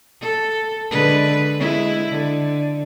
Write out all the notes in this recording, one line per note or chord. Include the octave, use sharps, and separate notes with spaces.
A4
D3 G#3 B4
G#3 E4
D3